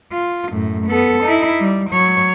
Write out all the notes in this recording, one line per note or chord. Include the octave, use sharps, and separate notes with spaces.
F4
F#2 A2
B3 A4
D#4 E4
G3
F#3 C#5